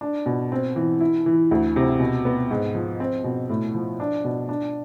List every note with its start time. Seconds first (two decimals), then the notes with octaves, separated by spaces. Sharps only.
0.01 D4
0.26 B2
0.52 C4
0.76 E3
1.00 E4
1.26 E3
1.51 D2
1.76 C3
2.00 B2
2.25 B3
2.51 G#2
2.75 F3
3.00 C4
3.24 B2
3.49 A2
3.75 F3
4.00 D4
4.24 B2
4.49 D4